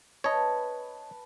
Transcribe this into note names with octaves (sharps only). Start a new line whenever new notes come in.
B4 C#5 D#5 A5 B5